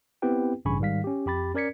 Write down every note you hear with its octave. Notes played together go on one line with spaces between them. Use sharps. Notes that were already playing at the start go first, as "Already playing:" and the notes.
B3 C4 E4 G4 B4 G5
A1 G2 C#3 G#5 B5 C#6
G#2 D#3 G3 F5 B6
C#4 G4
F2 G4 B5 A6
C#4 A#4 D5 G#6 B6 C#7